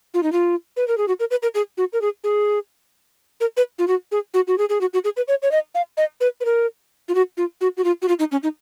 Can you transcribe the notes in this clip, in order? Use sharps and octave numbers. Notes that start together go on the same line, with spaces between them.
F4
D#4
F4
B4
A#4
G#4
F#4
A#4
B4
A#4
G#4
F#4
A#4
G#4
G#4
A#4
B4
F4
F#4
G#4
F#4
F#4
G#4
G#4
F#4
F#4
G#4
B4
C#5
C#5
D#5
F5
D#5
B4
B4
A#4
F4
F#4
F4
F#4
F#4
F4
F#4
F4
D#4
C#4
D#4